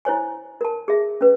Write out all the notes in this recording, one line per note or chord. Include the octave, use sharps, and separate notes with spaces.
E4 C5 C#5 G#5
A#4 A5
G#4 E5
C#4 B4